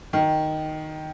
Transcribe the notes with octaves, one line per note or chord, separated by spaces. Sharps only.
D#3